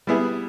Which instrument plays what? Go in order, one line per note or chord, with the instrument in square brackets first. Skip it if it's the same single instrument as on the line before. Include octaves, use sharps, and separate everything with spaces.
[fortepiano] G3 B3 E4 G#4